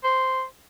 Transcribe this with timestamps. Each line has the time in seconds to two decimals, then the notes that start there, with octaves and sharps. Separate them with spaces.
0.04 C5